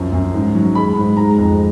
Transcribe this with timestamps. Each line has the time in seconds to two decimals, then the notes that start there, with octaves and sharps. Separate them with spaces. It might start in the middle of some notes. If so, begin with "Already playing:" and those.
Already playing: F#2 F3
0.13 F#2
0.34 G#2
0.55 F#3
0.75 G#3 B5
0.96 G#2
1.17 G#3 A#5
1.38 F2